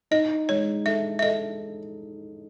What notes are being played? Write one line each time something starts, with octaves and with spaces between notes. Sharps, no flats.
D#4 D#5
G#3 C#5
A4 E5
E5
A4 D#5